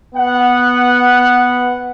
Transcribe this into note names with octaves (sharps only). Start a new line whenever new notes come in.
B3 F#5